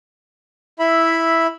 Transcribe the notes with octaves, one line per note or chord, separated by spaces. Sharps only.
E4 E5 B5